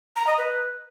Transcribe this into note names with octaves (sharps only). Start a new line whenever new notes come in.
A#5
D#5
B4